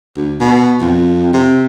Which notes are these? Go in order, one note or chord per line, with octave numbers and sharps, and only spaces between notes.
D2
B2
F2
C3